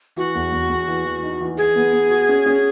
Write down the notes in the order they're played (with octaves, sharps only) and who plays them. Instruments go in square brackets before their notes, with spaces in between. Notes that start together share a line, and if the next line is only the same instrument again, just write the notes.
[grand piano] E3 [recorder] F#4
[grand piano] E2
E2
E2
E3
E3
D#4
E3
[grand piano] E3 [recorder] G#4
[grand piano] B3
B3
F#4
C#4
C#4